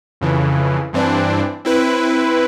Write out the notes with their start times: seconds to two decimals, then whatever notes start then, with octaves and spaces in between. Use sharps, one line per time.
0.21 F2 C#3 E3
0.93 G2 E3 C4 D4
1.65 C4 E4 B4